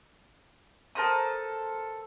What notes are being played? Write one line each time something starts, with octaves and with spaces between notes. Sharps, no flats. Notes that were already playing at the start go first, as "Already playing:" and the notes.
A4 A#4 C5 D#6